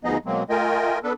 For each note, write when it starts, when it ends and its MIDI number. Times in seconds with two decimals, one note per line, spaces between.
0.04 0.18 38
0.04 0.18 53
0.04 0.18 59
0.04 0.18 63
0.04 0.18 68
0.04 0.18 75
0.26 0.43 47
0.26 0.43 54
0.26 0.43 56
0.26 0.43 58
0.26 0.43 60
0.50 0.99 57
0.50 0.99 65
0.50 0.99 70
0.50 0.99 75
0.50 0.99 79
0.50 0.99 80
1.03 1.13 59
1.03 1.13 62
1.03 1.13 69
1.03 1.13 71